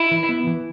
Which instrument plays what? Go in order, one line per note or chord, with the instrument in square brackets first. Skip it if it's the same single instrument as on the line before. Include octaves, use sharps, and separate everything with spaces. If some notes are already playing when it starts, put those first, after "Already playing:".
Already playing: [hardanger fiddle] E4
[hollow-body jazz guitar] E3
B3
E3